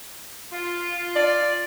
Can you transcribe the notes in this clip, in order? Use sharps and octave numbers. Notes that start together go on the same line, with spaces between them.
F4
D5